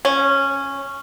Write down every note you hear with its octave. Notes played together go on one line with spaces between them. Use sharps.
C#4